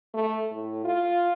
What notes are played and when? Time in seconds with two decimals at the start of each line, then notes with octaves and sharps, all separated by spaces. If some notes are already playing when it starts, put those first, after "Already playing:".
0.14 A3
0.51 A2
0.84 F4